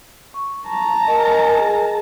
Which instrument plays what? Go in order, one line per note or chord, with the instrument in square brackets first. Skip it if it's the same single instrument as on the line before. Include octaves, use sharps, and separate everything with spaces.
[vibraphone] C#6
[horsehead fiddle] A5 A#5
[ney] A#4 [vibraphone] D#5 [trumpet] G#5
[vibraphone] G#4